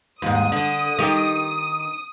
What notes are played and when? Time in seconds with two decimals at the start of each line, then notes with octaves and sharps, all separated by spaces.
0.22 D#2 G#2 D#6
0.52 D3
0.99 D#3 G4